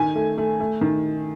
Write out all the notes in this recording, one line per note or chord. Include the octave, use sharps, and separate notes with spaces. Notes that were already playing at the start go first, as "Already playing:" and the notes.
Already playing: D#3 G#5
A3
A3
A3
D#3